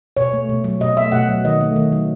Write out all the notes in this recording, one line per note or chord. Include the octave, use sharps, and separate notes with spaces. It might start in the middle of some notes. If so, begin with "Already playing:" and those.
B2 C#5
A3
B2
F#3
B2 D#5
A3 E5
B2 F#5
F#3
D#3 D#5
A3
D#3
F#3